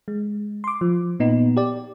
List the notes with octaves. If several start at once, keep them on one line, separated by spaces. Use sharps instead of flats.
G#3
C6 D6
F3
A#2 B3 D#4
G4 D5